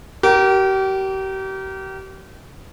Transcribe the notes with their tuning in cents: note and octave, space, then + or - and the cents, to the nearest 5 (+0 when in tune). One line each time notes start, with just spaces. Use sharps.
G4 -35 A#4 +5